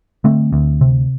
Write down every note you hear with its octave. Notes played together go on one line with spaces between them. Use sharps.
D3 A3 C4
D2
C3